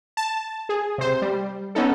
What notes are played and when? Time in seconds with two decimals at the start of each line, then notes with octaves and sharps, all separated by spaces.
0.17 A5
0.69 G#4
0.98 C3 C5
1.22 G3
1.75 B3 C#4 D#4 A4